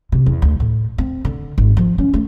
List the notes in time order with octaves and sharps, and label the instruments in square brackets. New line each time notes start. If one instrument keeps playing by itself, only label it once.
[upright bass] C3
E2
D2
A2
C4
D3
G#1
F3
C#4
A3